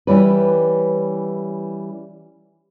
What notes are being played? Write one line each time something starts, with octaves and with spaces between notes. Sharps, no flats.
E3 G3 C#4 B4